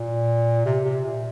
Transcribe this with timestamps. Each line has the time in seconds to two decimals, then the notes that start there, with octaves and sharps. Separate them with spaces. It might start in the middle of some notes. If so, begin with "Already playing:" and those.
Already playing: A#2
0.66 C3
0.85 C3
1.04 A#2